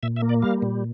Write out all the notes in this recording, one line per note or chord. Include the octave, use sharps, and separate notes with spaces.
A#2 E5
E5
A#3
D5
G3 F5
A#2